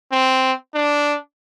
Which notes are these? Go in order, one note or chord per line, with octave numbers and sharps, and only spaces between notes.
C4
D4